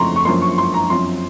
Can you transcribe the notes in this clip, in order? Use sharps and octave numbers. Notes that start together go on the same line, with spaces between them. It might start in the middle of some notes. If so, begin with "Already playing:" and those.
Already playing: F2 C#3 A3 A#5 C6 C#6
C#6
F#2 F3 A#3 C6
C#6
C6
A#5
F#2 F3 C4 C6